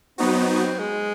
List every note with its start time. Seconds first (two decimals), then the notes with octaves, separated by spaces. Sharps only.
0.18 F#3 B3 C4 D#4 F#4
0.79 G#3